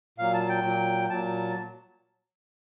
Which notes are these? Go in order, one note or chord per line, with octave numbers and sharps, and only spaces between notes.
A#2 F#3 F5
A5
G5
A#2 F#3
A#2 F#3 A5